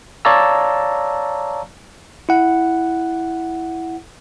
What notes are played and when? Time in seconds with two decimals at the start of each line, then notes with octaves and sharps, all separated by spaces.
0.25 C#5 D5 F5 A5 A#5 E6
2.29 E4 F#5